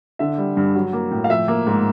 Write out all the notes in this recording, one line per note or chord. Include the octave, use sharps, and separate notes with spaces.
D3 E5
G3
G2
F#3
A#3
A2
F5
F3 E5
A#3
G#2